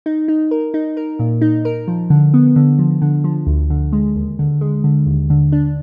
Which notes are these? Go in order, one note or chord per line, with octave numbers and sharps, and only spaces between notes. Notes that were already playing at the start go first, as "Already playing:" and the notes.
D#4
D#4
A#4
D#4
A#4
A#2
D#4
A#4
F3
D3
B3
D3
F3
D3
F3
D2
D3
G#3
D#2
D3
G#3
D3
D#2
D3
D4